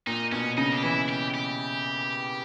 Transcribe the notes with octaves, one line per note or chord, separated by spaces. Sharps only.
A#2 D#4
B2 C#4
C#3 D#4
G4
E3 E4
G4
G4